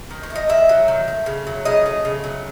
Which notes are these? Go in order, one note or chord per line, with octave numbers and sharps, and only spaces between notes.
D#3
C#5
A3
D#5
D#3 E5
F#3
D#3
A3
C#3
F#3
C#3 D#5
A3
C#3
F#3